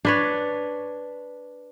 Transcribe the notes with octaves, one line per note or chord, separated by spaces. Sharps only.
D4 B4 C#5